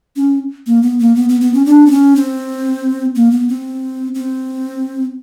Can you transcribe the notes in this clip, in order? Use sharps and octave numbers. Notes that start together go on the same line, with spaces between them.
C#4
A#3
B3
A#3
B3
B3
B3
C#4
D4
C4
C#4
C4
A#3
B3
C4
C4